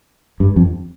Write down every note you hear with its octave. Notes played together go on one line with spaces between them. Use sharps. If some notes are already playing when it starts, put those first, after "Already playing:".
G2
F2